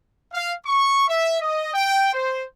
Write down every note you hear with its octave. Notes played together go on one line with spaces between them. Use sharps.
F5
C#6
E5
D#5
G5
C5